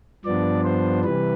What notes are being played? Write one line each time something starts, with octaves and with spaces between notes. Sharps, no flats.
G2 F3 B3 D4 D5
C5
C3 E3 G3 B4